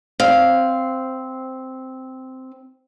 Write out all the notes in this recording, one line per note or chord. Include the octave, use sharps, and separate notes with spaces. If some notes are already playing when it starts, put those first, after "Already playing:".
C4 F5